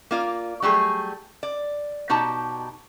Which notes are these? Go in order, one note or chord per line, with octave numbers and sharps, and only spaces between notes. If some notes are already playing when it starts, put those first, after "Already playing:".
A#3 F4 D5
F#3 G3 A3 G#4
D5
B2 D#4 G4 A5